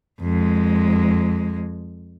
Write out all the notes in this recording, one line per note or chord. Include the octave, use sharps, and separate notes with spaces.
F2 G#3